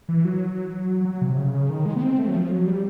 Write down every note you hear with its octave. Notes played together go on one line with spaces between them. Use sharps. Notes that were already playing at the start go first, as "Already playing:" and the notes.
E3
F#3
F#3
C3
C#3
C#3
D#3
G#3
B3
C4
A3
F#3
F3
F#3
G3